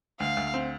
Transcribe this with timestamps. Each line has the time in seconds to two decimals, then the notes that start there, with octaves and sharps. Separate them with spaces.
0.20 D2 F5
0.37 D2
0.54 C4